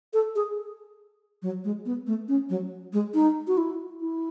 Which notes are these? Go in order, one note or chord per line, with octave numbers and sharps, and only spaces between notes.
A4
G#4
F#3
G#3
B3
A3
C#4
F#3
G#3
D#4
F#4
E4
E4